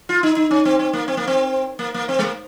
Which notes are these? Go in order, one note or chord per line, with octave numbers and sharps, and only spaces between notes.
F4
D#4
D#4
C#4
C4
C4
A#3
C4
A#3
C4
A#3
A#3
C4
G#3
A#3